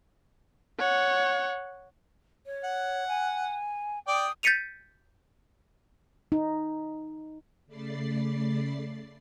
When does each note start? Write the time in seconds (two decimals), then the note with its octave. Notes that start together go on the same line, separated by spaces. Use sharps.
0.79 C#5 F#5
2.46 C#5
2.64 F#5
3.08 G#5
4.07 D5 G5 D#6
4.43 G6 A6 B6 C#7 D#7 F7
6.32 D#4
7.67 C#3 A3 D5 B5 A6 C7